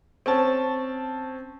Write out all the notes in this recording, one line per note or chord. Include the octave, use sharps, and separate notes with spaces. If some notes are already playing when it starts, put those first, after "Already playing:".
C4 C#4 A5